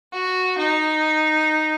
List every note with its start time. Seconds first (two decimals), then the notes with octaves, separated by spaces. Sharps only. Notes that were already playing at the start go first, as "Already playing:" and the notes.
0.12 F#4
0.58 D#4